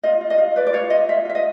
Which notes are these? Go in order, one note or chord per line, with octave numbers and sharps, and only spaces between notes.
F4 D#5
F4
D#5
F4
B4 D5
D5
F4 C#5
F4 D#5
F4 E5
F4 E5
D#5